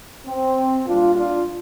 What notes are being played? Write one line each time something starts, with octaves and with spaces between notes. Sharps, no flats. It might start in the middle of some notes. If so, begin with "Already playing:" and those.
C4
A#2 G3 D4 F4
D4 F4